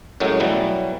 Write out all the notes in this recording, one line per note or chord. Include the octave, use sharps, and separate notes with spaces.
F#2 A2 F#3 G#3
B2 E3 F#3 G3